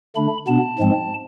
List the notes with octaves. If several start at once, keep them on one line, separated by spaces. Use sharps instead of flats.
D3 A3 D4 B5
B2 B3 D4 A5
G#2 F3 G#3 C4